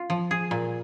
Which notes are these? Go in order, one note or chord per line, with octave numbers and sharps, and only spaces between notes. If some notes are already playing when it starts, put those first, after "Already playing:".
Already playing: F4
F3
G#4
A#2